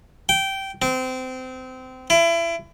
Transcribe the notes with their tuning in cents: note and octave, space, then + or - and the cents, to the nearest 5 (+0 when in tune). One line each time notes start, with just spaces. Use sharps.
G5 -15
C4 -25
E4 +30